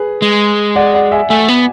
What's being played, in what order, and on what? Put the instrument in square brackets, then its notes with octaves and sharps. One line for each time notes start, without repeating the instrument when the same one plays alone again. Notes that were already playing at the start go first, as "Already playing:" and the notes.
Already playing: [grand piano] G#4 B4
[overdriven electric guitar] G#3
[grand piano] D5 F#5
D5 F#5
E5 G#5
[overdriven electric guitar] A3 [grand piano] E5 G#5
[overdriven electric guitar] B3